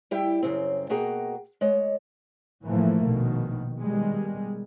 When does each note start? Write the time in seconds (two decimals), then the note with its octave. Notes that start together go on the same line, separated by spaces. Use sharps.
0.11 G3 E4 G4 E5 G5
0.42 F#2 C#3 C4
0.90 B2 A#3 F#4 G#4 G5 A#5
1.61 G#3 C#5 D#5
2.63 A2 E3 F3 A3 A#3
3.06 A#1 B2 D#3
3.81 B2 D#3 G3 G#3